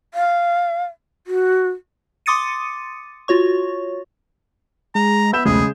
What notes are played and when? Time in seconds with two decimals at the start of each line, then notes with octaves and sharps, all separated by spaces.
0.14 F5
1.27 F#4
2.26 C6 D6 D#6 A6 C#7 D#7
3.28 F4 F#4 C#5 C#6
4.95 G#3 A#5
5.33 B3 E5 B5 G6 E7
5.45 B1 E2 C#3 G#3 A3 G#4